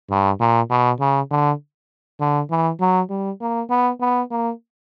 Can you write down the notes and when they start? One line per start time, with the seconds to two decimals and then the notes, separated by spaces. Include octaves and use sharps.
0.10 G2
0.40 A#2
0.70 B2
1.00 C#3
1.31 D3
2.20 D3
2.50 E3
2.80 F#3
3.10 G3
3.41 A#3
3.70 B3
4.01 B3
4.31 A#3